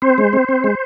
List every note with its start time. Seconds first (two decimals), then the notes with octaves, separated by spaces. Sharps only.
0.02 C4 C5
0.18 G#3
0.33 C4
0.49 C4
0.64 G#3